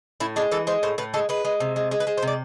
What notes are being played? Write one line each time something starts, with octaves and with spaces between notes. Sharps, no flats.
A2 E4
G#3 D4
E3 A4
G#3 C5
A2 C5
A2 B4
G#3 A4
G#3 B4
G#3
C3
G#3
G#3
B4
G#3 C5
C5
C3
D5